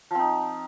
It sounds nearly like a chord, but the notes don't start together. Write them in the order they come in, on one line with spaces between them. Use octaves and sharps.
F3 C4 D#4